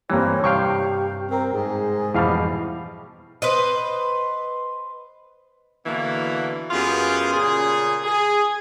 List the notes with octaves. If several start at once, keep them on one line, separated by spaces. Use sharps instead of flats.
G2 E3 G3 A#3 C4 C#5
G2 C3 G4 F5 G5 C#6
C4 A#4
G#2 G#4
F2 B2 E3 G3 F5
B4 C5 D#5
B2 D3 E3 A#3
F#2 B3 F4 G4 G#4
A#2 C#3 G#4
G#4